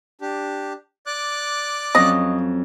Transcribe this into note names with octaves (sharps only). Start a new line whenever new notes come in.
D4 G4
D5 D6 F#6
F2 F#3 C#4 D#5